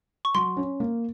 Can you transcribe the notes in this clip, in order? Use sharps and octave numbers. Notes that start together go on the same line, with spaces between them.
C#6
F#3 C6
C#4
A#3